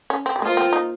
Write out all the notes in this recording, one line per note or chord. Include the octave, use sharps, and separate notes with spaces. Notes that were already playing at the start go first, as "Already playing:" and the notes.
C#4
C4
G3
G#3 A#3 F4 C5
C4
D#4